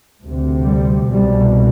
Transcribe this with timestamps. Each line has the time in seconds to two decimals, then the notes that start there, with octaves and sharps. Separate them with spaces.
0.22 D2 C3
0.64 G3
1.08 C2 B2 G3